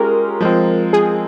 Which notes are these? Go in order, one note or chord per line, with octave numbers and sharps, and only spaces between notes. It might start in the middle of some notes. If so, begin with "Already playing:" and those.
Already playing: G#3 C#4 F4 G4 G#4 A#4
F3 G#3 C4
G#4